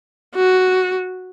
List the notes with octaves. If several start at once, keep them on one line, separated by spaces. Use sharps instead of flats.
F#4